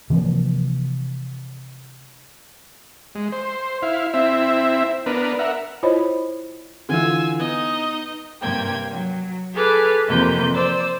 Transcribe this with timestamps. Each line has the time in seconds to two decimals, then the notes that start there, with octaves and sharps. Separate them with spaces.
0.10 C3 E3 F3 A#3
3.15 G#3
3.32 C5
3.82 E4 F5
4.14 C4 E4 E5
5.06 B3 D4 A#4 B4
5.39 A#4 E5 F#5
5.83 E4 F4 C5 C#5 D#5 B5
6.89 D3 E3 F4 G#5 E6
7.39 B3 D#4 D#5
8.42 G2 C3 A#3 G5 G#6
8.90 F#3
9.54 G#4 A4 B4 D6 F6
10.07 F2 C3 E3 A#3 B4 G6
10.54 C5 D5 E6